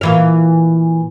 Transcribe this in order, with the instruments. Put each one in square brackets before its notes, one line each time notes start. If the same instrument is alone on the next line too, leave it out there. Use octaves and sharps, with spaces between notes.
[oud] A#2 E3 F5